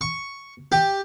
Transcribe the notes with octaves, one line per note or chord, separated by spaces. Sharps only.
C#6
G4